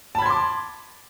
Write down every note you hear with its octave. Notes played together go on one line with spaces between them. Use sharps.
A5 B5 C6 D6 G#6